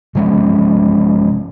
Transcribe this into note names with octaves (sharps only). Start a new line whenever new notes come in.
C3 F3 G#3 C#4